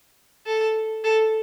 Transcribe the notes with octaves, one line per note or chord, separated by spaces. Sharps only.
A4
A4